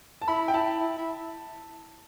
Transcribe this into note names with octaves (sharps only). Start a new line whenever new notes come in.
A5
E4 B5
G5
E4 A5
E4
E4